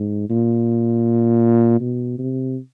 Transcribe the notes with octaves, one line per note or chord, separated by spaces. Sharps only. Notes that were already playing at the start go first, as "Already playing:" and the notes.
Already playing: G#2
A#2
B2
C3